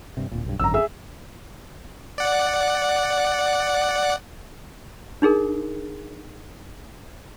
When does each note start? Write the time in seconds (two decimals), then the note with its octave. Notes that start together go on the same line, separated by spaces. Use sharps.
0.17 G2 C3
0.32 D1 A#2
0.45 B1 G2
0.60 G#1 F#2 D3 A#5 E6
0.74 G#4 E5 E6
2.18 D5 F#5
5.22 D4 D#4 G#4 A#4